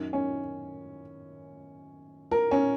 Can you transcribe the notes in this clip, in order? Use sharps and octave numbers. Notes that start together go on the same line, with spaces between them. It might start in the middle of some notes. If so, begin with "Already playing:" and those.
Already playing: F#2 D#3
C#4
A#4
C#4